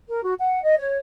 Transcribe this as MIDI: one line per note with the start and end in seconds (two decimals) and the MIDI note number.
0.09 0.23 70
0.25 0.34 66
0.39 0.63 78
0.63 0.74 75
0.78 0.98 73